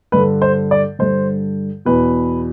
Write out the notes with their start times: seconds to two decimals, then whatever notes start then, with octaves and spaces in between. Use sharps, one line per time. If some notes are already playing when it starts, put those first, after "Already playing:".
0.12 G2 D3 B4
0.42 C5
0.71 D5
0.99 G2 D3 C5
1.85 E2 B2 B4